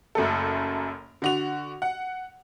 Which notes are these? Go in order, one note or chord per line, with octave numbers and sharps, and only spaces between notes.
F#1 F#2 A3 A4
D3 F#4 F7
F#5